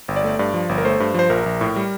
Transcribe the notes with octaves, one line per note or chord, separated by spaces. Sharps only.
G1
D5
A3
G2 D5
F3
G1
A#4
A3 C5
G2
F3 C5
A#1 A#4
A#1
A2
G3